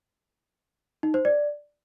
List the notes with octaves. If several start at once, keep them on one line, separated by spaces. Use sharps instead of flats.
D#4
C5
D5